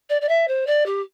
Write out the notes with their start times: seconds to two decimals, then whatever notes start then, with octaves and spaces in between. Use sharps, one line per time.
0.09 D5
0.21 D5
0.28 E5
0.47 C5
0.66 D5
0.85 G4